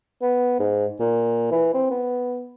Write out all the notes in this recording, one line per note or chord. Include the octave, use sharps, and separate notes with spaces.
B3
G#2
A#2
E3
C4
B3